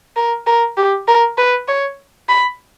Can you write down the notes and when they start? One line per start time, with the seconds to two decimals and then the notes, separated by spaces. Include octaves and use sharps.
0.17 A#4
0.47 A#4
0.77 G4
1.08 A#4
1.38 B4
1.68 C#5
2.29 B5